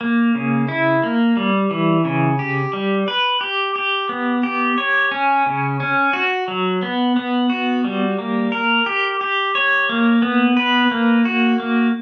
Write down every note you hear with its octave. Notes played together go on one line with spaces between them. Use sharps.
A#3
C#3
E4
A#3
G3
E3
C#3
G4
G3
B4
G4
G4
B3
G4
C#5
C#4
C#3
C#4
F#4
F#3
B3
B3
F#4
G3
A#3
A#4
G4
G4
C#5
A#3
B3
B4
A#3
F#4
A#3